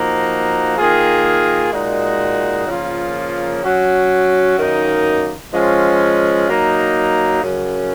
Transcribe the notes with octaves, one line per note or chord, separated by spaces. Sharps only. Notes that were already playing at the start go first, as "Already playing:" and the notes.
Already playing: F3 A#3 D#4 F#4
D#3 A#3 F4 G#4
A#2 G#3 D#4 F#4
C#3 F3 A#3 F4
F#3 C#4 F#4
F#2 D#3 A#3 D#4
F3 G#3 C#4 F4
F#3 A#3 D#4
F#2 C#3 F#3 C#4